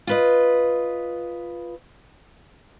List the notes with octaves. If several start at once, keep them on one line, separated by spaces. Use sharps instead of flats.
F4 B4 D#5